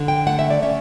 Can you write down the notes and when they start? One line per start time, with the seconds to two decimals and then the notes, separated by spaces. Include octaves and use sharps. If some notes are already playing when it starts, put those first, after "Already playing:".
Already playing: D3
0.08 G5
0.27 A3 F#5
0.39 E5
0.50 D5
0.62 C#4 E5